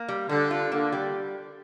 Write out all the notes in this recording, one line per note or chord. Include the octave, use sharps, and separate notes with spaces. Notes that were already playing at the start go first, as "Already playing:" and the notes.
Already playing: A#3
G3
D3 G3
F4
D3 A#3
G3